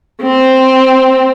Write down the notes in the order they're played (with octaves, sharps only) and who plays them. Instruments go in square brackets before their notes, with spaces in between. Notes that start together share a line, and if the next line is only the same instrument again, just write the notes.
[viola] C4